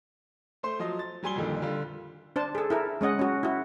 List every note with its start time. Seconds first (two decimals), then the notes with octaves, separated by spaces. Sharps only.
0.63 A3 C5 C6
0.79 F3 F#3 D#5 C6
0.99 A6
1.23 F#3 G3 G#5 C6 G7
1.35 F2 A#2 D3 D#3 G3
1.62 D3 G3 F4
2.36 D4 C5 A5
2.55 G#4 A4
2.70 E4 A4 A#4
3.01 G#3 C#4 D#5 F#5
3.19 C#4 F#4
3.43 E4 F#4